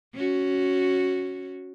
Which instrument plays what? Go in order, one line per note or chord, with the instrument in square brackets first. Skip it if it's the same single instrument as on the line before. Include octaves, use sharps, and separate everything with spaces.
[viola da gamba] C#4 F#4